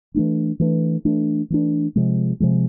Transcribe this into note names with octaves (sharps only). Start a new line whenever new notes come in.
E3 A3 D4
E3 A3 D4
E3 A3 D4
E3 A3 D4
C3 F3 G#3
C3 F3 G#3